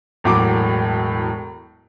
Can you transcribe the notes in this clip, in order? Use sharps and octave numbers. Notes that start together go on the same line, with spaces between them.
E1 A2 F#3 D6